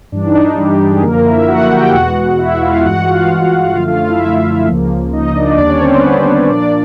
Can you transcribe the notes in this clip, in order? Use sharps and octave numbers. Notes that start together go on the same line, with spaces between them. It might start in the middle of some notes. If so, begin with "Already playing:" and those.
G2 E3 G3 D4
D#4
D4
G3 G4
G3 G4
G#3 G#4
F#2 D3 F3 A#3 A#4
E4 E5
F#4 F#5
G4 G5
E2 B2 G#3 B3 F#4 F#5
E4 E5
F4 F5
G2 E3 G#3 F#4 F#5
F4 F5
F#2 D3 F3 A3 F4 F5
F4 F5
F4 F5
E4 E5
C#2 C#3 F3 A#3
D#4 D#5
D4 D5
D#2 D3 G3 A#3 D4 D5
C#4 C#5
C4 C5
B3 B4
C4 C5
A#2 F3 A#3 D4 D5